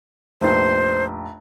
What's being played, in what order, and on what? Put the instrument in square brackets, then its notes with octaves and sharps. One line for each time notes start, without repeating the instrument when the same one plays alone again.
[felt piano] F1 A#1 [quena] C5